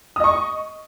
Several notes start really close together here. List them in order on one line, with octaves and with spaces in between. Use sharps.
D#6 D#5 C#6